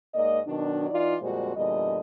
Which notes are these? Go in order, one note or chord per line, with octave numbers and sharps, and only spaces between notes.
G#2 A#3 D5 D#5
B2 D#3 F#3 D4
E3 D#4 F4 D5
F2 A#2 G3 G#3 F#4 C5
E2 A#2 D3 G3 D#5